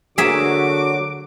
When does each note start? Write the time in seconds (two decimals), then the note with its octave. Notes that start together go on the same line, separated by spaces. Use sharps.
0.18 D3 F#3 A#3 F#4 G#4 E5 D6